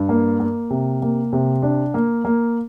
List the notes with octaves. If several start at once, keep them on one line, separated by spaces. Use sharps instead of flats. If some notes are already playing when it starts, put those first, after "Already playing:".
Already playing: G2
A#3
A#3
C3
A#3
C3
D4
A#3
A#3